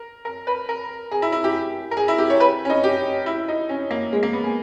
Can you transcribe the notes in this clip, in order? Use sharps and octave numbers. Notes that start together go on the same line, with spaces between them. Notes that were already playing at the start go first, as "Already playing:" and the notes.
Already playing: A#4
A#4
B4
A#4
G#4
E4
E4
G4
A#4
G#4
E4
G4
C#5
B4
C#4
D#4
G4
E4
D#4
C#4
A#3
G#3
A#3
B3
G#4